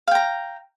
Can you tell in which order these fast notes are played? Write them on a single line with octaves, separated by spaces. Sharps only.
F5 G5 A#5